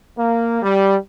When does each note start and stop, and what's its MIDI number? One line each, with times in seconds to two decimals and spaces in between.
0.17 0.61 58
0.62 0.95 55